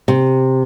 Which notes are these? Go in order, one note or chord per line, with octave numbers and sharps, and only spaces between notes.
C3